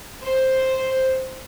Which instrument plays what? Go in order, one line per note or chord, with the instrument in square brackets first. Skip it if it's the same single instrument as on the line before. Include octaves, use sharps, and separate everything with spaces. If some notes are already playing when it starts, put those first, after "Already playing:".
[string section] C5